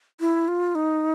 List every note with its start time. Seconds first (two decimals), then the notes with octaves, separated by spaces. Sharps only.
0.21 E4
0.48 F4
0.75 D#4